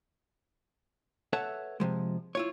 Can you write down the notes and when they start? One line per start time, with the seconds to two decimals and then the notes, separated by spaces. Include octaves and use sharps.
1.33 A4 B4 C#5 E5 F#5 A5
1.80 C3 F3 G#3
2.35 E4 F4 C#5